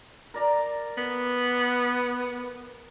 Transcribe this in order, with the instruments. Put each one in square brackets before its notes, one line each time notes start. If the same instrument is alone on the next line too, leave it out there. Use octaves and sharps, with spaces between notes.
[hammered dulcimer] A#4 D5 A#5
[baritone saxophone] B3